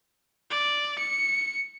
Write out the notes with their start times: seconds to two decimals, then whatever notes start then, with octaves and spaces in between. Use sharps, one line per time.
0.51 D5
0.98 C#7